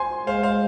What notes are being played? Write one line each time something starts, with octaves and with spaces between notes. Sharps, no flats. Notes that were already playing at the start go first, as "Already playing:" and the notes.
Already playing: C5 G#5 C6
G#3 C5 F5
C5 F5